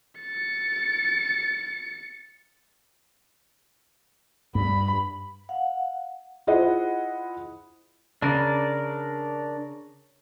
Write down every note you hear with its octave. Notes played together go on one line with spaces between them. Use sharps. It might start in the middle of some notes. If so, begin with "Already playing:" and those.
A6 C#7
G2 B5
F5 F#5
E4 F4 G#4 C5 D#5 F#5
C#3 D4 A#4 D5